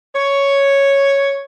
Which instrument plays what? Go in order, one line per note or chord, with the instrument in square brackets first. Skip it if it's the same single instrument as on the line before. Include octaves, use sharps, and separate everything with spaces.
[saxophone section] C#5